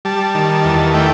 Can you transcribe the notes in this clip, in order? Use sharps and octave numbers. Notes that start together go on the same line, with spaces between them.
G3 A5
D#3
E2
A3 G5